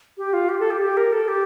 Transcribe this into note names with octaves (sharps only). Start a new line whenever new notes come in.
G4
F4
G4
A4
G4
G4
A#4
A4
G4